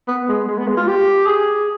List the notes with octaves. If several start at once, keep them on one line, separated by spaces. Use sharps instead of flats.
B3
G#3
G#3
B3
G#3
F4
G4
G#4